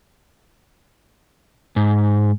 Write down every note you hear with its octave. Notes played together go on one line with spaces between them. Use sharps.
G#2